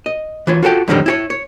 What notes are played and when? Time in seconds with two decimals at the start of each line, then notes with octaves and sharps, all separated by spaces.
0.06 D#5
0.47 E3 F4 C#5
0.63 F4 F#4 A4 G5
0.88 F2 A2 D3 D#3 F#3 G3
1.06 E4 G4 C#5
1.30 C#5